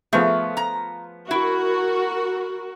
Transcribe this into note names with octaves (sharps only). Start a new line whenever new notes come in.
F3 A3 B3 G#4
A#5
E4 F#4 A#4